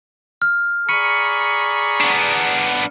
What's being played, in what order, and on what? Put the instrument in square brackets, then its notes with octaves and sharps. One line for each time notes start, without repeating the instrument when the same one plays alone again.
[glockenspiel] F6
[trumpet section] G#4 D5 A#5 [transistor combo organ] B5 C#6 [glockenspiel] C#7 D#7
[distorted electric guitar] B3 D4